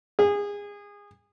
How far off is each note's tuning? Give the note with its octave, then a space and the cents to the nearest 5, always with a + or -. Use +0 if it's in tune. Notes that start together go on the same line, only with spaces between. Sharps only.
G#4 -25